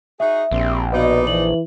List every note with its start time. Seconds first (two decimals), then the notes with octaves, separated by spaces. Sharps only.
0.20 D#4 F#4 G#4 E5
0.51 A#1 G2 A#2 C4
0.93 B2 D#4 B4 D5 D#5
1.27 E3 F#7